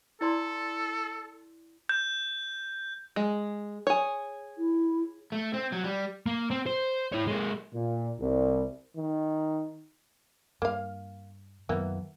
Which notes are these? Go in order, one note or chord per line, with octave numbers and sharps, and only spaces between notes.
E4 A4 D5 C6
G6
G#3
G#4 C#5
E4
A3
C4
F#3
G3
A#3
C4
C5
E4 C#5
G#3 A#3
A#2
C2
D#3
G2 A#3 F5
F#2 D#3 E3 F#3 A#3 B3